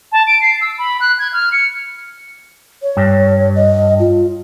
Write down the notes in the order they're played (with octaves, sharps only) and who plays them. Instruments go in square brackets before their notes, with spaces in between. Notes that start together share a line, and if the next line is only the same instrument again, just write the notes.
[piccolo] A5
D7
C7
E6
B5
F#6
G#6
F6
C#7
[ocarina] C#5
[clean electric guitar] G2
[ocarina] D#5
F4